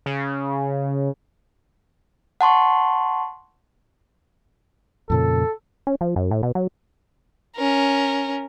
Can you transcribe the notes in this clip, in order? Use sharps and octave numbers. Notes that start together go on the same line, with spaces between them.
C#3
F#5 A5 C6 C#6
F2 A#2 C#3 A4
C#4
F3
F#2
A2
B2
F#3
C#4 A#4